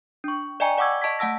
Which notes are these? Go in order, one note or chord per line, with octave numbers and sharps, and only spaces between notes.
D4 C#6
D5 D#5 G5 G#5 A#5 C#6
D5 F#5 C#6 D6 E6 G#6
D#5 A5 C#6 G#6 B6
A3 F#5 A5 E6 A#6